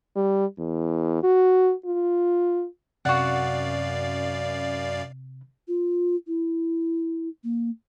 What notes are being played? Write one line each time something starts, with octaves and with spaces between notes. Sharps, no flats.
G3
E2
F#4
F4
F#2 C3 F#4 D5 F5 F#5
F4
E4
A#3